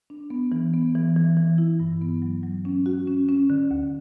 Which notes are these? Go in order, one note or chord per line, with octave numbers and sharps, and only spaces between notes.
D4
B3
E3
B3
E3
E3
E3
E4
G2
B3
F#3
F#3
C#4
F#4
C#4
C#4
D3
D2